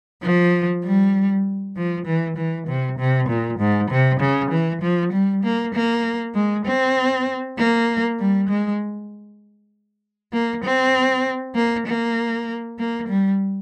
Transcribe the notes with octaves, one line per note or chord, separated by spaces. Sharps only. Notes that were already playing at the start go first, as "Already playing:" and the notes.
F3
G3
F3
E3
E3
C3
C3
A#2
G#2
C3
C#3
E3
F3
G3
A#3
A#3
G#3
C4
A#3
G3
G#3
A#3
C4
A#3
A#3
A#3
G3